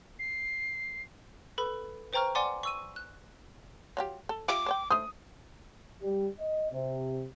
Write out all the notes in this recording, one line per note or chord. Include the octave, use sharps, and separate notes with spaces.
C7
A4 B4 B5
B4 C5 G5 A#5 C#6 F6
D5 F#5 G#5 C6 D6
C#6 E6 D#7
F#6
F#3 F4 G4
A4
F4 G4 E5 D6
C5 C#5 G5
A3 C5 D#6
G3
D#5
C3